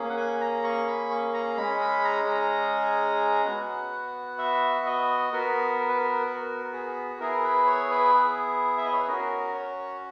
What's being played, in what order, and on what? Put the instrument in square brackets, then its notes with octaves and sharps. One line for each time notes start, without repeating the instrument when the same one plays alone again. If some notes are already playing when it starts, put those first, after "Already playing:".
Already playing: [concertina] A#3 C#4 G#4
F#5
G#5
A#5
C#6
B5
C#6
A#5
G#3 C#4 G#4 B5
B5
A#5
A#5
B3 F#4 F#5
E5
D#5
B3 F#4 A#4
A#4
B4
A#4
A#4
A#4
G#4
B3 E4 G#4 A#4
B4
C#5
B4
G#4
E5
D#5
C#5
B4
C#4 F#4 A#4
C#5